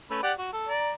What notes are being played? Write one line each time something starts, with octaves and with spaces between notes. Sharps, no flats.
A3 C#4 B4
G4 D5 F#5
F#4
A4
D5 A#5